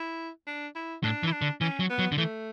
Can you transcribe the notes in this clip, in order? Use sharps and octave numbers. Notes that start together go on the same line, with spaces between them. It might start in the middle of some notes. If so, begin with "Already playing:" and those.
Already playing: E4
D4
E4
A2 D4
E3
E4
D4
D3
E3 C#4
F#3
B3
F#3
D3
E3 A3